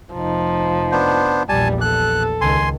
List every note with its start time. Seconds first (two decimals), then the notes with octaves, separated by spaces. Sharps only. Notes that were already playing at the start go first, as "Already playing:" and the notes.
0.14 F1 F3 D#4
0.92 B3 D4 C5
1.49 A#1 E2 G3 G#5 A5
1.81 A4 F#6
2.41 C#2 D#3 G#5 C6